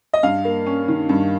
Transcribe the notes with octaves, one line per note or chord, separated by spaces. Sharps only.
D#5
G2 F5
A#3
C#4
D#3
G2